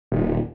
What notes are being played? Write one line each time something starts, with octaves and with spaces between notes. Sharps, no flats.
D#1